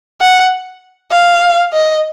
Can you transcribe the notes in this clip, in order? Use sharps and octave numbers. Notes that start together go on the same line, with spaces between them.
F#5
F5
D#5